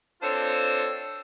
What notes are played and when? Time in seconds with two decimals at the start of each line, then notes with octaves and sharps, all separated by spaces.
0.22 C4 D4 F4 A4 C5 C#5